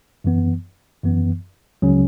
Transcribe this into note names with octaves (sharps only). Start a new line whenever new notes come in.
F#2 E3 B3
F#2 E3 B3
C#2 C#3 F#3 C#4